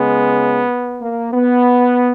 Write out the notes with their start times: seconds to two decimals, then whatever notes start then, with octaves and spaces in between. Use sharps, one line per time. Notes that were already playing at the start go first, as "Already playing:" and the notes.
Already playing: C#2 C#3 G#3 B3
1.02 A#3
1.33 B3